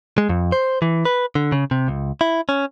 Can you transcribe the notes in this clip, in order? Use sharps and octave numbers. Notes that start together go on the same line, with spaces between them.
G#3
F2
C5
E3
B4
D3
C#3
C3
C#2
E4
C#4